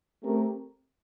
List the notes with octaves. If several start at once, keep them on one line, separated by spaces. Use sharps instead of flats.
A3 C4 G4 A#4